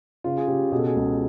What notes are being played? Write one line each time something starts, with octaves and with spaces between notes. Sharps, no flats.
C#3 F4
G#4
C#3 G4
B2 G#4
A4
G#4
C#2